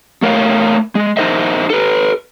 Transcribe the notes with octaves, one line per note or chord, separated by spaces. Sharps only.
A3 A#4 C#5 F5
G#3
D#4 F4 A#4 C5 D#5 E5
A4 B4